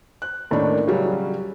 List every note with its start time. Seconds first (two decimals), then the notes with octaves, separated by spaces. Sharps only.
0.22 F#6
0.51 D#2 A2 D#3 C#4 D4
0.87 C#3 F#3 G3 C#4